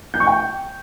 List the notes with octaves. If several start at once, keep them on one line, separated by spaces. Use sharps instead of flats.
G6
C#6
G5